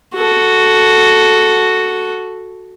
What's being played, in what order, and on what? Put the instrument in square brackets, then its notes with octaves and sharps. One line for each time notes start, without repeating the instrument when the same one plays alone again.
[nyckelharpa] F#4 A4